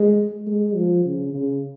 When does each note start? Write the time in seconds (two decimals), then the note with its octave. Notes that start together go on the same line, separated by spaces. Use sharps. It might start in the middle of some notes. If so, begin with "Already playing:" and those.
Already playing: G#3
0.47 G#3
0.76 F3
1.05 C#3
1.34 C#3